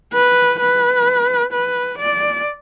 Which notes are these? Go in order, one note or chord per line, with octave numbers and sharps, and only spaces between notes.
B4
B4
B4
D5